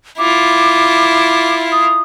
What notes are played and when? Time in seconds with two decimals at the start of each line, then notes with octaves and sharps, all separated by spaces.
0.19 E4 F4 D6
1.72 D#6